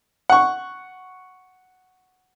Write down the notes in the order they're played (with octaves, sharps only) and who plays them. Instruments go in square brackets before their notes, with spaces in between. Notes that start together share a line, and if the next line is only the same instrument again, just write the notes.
[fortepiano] F#5 C#6